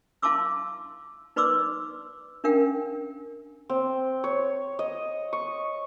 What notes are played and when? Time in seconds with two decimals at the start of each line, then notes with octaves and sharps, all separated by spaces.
0.22 E4 F5 A5 C6 D6 E6
1.36 D#4 B4 D5 C6 D6 E6
2.44 C#4 D4 A#4 F5 G5
3.69 C4
4.24 C#5
4.79 D#5
5.33 C#6